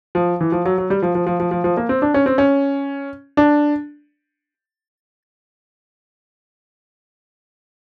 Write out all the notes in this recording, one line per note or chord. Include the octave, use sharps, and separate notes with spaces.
F3
E3
F3
F#3
F#3
G3
F3
F3
F3
F3
F3
F3
A#3
C4
D4
C#4
C4
C#4
D4